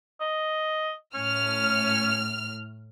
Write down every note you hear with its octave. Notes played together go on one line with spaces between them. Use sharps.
D#5
A2 C#4 F6